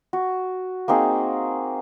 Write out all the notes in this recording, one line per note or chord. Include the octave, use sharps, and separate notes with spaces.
F#4
A#3 C4 D#4 G#4